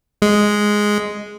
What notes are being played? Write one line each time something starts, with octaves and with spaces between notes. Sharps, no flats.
G#3